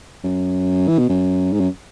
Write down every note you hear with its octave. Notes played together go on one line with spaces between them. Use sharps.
F#2
E3
B2
F#2
G#2
F#2